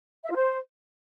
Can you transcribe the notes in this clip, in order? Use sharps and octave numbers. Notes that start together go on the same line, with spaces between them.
E5
F4
C5